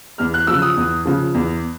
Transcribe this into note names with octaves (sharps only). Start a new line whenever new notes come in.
E2 F6
F#6
C#3 F3 E6
D#6
E2
C#3 F3
E2